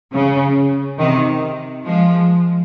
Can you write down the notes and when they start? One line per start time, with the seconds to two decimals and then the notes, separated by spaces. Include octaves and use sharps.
0.13 C#3
0.98 C3 D#3
1.86 F3 G#3